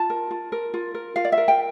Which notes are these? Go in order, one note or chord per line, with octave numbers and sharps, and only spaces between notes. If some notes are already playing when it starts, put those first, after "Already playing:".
Already playing: F4 A5
A#4
F4
A#4
F4
A#4
F4 F5
D5
E5
A#4
G5